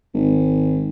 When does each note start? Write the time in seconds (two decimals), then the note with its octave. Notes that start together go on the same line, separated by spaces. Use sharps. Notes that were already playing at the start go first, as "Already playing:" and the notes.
0.14 G#1